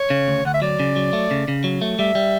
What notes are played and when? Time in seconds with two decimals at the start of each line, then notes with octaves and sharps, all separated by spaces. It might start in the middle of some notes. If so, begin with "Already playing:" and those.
Already playing: C#5
0.10 C#3
0.28 D2
0.45 D2 F#5
0.54 E5
0.62 F#3 D5
0.80 C#3
0.96 F#3
1.13 A3
1.31 C#3
1.48 C#3
1.64 F#3
1.81 A3
1.99 G3 E5
2.15 G3